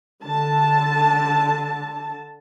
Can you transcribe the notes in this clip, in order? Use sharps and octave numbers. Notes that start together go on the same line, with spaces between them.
D3 A5